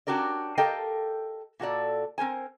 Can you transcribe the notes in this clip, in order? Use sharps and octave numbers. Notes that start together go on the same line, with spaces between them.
C#4 D4 F#4 G4 A#4 D5
G4 A4 A#4 D#5 F5 G5
A#2 F#4 A4 D5
C4 A#4 C5 G#5